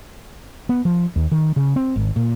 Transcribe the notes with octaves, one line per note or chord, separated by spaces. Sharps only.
B3
F3
D#2
D#3
C#3
C4
G#1
A#2